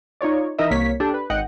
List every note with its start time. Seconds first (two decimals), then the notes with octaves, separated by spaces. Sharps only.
0.21 D#4 F4 C#5 D5
0.58 E3 D#4 A#4 D#5 E5
0.71 C2 A#3 C#5 B6
1.00 D4 G4 A4
1.14 B4
1.30 G#1 D#5 F#5 G5